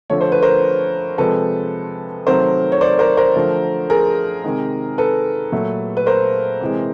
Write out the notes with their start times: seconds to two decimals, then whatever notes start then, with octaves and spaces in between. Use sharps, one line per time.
0.10 D3 F3 A3 C#5
0.21 C5
0.32 B4
0.42 A#4 C5
1.18 C3 F3 G#3 A4 B4
2.27 C3 D#3 F#3 A3 A#4 C5
2.72 C#5
2.81 C5 D5
2.99 A#4 C5
3.17 A#4 C5
3.35 D3 F3 A3
3.90 G#4 A#4
4.44 C3 D#3 G#3
4.98 A4 B4
5.52 A#2 F#3 A3
5.97 B4
6.06 A#4 C5
6.61 C3 E3 G#3